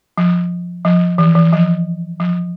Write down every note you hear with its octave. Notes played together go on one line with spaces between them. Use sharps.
F3
F3
E3
E3
F3
F3